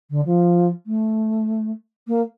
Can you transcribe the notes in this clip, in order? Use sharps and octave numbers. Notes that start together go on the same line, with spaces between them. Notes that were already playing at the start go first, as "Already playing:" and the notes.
D3
F3
A3
A#3